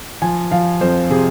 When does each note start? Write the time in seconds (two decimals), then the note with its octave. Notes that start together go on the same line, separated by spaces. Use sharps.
0.22 F3 G#5
0.51 F3 F5
0.81 F2 C5
1.10 C3 G#4